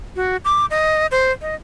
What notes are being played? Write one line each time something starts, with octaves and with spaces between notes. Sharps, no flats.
F#4
D6
D#5
C5
D#5